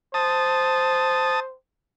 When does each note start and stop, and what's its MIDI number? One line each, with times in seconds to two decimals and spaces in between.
0.14 1.56 72
0.14 1.40 81
0.14 1.40 87